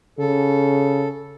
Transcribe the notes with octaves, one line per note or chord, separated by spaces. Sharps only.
C#3 A4